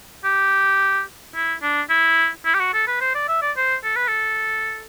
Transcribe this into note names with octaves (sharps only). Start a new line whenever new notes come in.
G4
E4
D4
E4
E4
G4
F#4
A4
B4
C5
D5
E5
D5
C5
A4
B4
A4